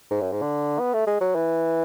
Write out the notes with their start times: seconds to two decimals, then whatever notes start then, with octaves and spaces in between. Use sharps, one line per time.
0.11 G#2
0.21 F#2
0.32 G#2
0.42 D3
0.79 B3
0.94 A3
1.07 G#3
1.21 F#3
1.35 E3